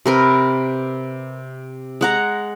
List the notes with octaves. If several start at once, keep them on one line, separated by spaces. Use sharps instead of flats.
C3 A#4 B4
G#3 F#5 A#5